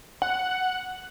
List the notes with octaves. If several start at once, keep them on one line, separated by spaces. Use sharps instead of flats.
F#5